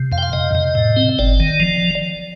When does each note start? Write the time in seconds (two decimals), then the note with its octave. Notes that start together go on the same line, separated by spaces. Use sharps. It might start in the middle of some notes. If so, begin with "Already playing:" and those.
Already playing: C3
0.12 F2 F5
0.18 G5
0.23 F5
0.33 C3 D#5
0.55 C3
0.75 A2
0.97 C4
1.19 G1 D5
1.40 D#3
1.60 F3